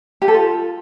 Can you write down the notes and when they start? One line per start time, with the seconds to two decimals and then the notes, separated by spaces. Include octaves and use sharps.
0.22 G4
0.28 A4
0.34 F4